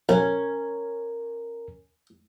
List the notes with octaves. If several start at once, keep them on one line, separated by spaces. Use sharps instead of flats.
B1 C#4 A#4